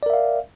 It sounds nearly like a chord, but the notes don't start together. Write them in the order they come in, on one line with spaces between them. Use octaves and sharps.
D5 A#4 E5 F5